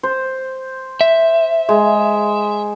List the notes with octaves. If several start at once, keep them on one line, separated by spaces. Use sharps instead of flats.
C5
E5
G#3